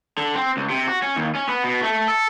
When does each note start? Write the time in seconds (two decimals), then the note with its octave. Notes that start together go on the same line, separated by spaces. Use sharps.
0.18 D3
0.35 C4
0.57 C#2
0.70 C3
0.87 F#4
1.02 C#4
1.16 D#2
1.35 C#4
1.49 B3
1.64 B2
1.82 A3
2.08 A4